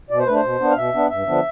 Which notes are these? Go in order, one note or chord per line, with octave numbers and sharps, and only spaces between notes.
B2 D5
C5
A3 D4 B4
C5
B2
B3 D4
F5
B2 E5
B3 D4
G2 E5
D3 F3 B3 D4